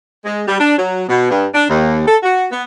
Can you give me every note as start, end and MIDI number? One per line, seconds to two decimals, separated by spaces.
0.25 0.43 56
0.48 0.56 55
0.60 0.76 62
0.78 1.04 54
1.08 1.29 47
1.31 1.47 43
1.54 1.63 62
1.69 2.02 39
2.06 2.17 69
2.23 2.46 66
2.51 2.63 59